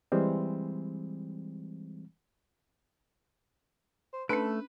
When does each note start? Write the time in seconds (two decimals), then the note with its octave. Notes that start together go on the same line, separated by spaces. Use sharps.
0.12 E3 G3 G#3 C4
4.13 C5
4.29 A3 C#4 D4 A4 B4